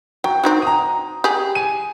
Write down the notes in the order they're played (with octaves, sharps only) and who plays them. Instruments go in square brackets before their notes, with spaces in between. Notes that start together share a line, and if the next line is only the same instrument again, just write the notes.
[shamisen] F#3 [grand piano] G5
[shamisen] C4 D#4 F#4
[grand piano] A#5 D#6
[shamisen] G4 G#4
[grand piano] G#5 D#7